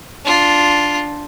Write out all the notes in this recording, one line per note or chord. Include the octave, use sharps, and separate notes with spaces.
D4 F4